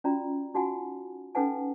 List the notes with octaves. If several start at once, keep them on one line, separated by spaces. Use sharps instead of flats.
C#4 F4 F#4 D5 A#5
D#4 F4 F#4 F#5 G#5
C#4 D#4 A4 B4 F#5 G#5